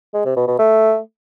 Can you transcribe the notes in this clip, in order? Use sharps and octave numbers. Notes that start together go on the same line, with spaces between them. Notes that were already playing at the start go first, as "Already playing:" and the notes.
G#3
C3
B2
B2
A3